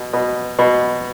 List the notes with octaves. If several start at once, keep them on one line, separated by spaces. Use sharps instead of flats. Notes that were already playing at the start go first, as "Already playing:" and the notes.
Already playing: B2
B2
B2